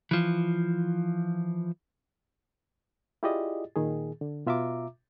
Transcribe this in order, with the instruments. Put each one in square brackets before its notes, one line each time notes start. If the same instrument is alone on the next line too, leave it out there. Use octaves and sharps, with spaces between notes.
[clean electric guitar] E3 F3
[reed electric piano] E4 F4 G4 G#4 D5 D#5
A#2 D#3 G#4
D3
B2 F4 E5 A#5 D6